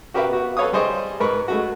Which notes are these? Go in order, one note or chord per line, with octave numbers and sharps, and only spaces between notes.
F#4 G4 A#4 B4 E5 F5
B3 F#4
A4 B4 C#5 F5 D#6
G3 G#4 C5 D#5 C#6
G#2 A#4 B4 B5 C#6
G#3 A3 F#4